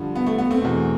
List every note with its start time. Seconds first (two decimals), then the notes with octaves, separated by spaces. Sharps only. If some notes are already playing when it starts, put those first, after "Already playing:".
Already playing: G2 D3 F3
0.15 B3
0.26 A3
0.38 B3
0.51 A3 C4
0.61 E2 B2